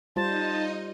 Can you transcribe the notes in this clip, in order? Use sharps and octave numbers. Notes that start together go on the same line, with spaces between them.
G3 D#4 F4 C5 D#5 A5